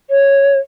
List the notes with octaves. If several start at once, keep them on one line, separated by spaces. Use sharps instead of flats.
C#5